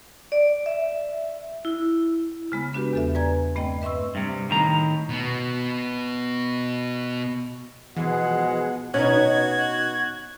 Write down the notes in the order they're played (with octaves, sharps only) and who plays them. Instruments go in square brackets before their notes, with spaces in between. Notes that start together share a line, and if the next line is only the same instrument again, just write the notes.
[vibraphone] D5
E5
E4
[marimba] C#3 G#3 B3
B3 D4 F#4 G4 B4
E2 A4 E5
B4 D5 G#5 A#5 G#6
G2 A3 C4 D#5 G5
B4 E5 C6 C#6 E6
[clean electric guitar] G2 C3
A2 D#3 A#5
[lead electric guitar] B2 B3
[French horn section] B2 F3 [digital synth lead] E3 [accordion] G#3 G#4 [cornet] F#5
[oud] B2 D#4 [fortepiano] C#4 [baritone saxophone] F#4 [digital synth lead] G#6